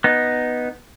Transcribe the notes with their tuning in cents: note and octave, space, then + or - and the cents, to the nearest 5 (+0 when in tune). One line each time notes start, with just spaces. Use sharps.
B3 +0 D#4 +0